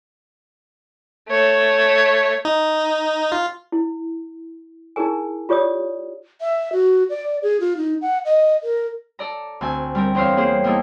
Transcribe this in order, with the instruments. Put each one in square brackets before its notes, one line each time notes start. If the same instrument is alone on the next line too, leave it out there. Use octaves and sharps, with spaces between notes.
[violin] A3 C#5
[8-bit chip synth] D#4
F4
[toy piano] E4
D#4 E4 G#4 A#4 G#5
F4 G4 C#5 D5 D#6
[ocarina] E5
F#4
D5
G#4
F4
D#4
F#5
D#5
A#4
[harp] A4 D5 A#5
D2 C4 G#5
G3 C4 A#4
E2 C4 C5 C#5 F5
A#3 C#4 G4 G#4 C5
G3 A#3 B3 D#4 E4 A4